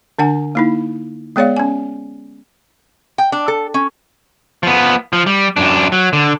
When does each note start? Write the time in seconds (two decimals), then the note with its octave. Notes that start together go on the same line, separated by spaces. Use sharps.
0.19 D3 D4 F#5 G#5
0.55 A#3 D#4 E4
1.36 G#3 B3 G#4 C#5 D5 F5
1.57 C#4 G#5
3.18 G5
3.32 D4
3.48 A4
3.74 C#4
4.63 F3 B3
5.13 F3
5.26 G3
5.57 F#2 D4
5.92 F#3
6.13 D3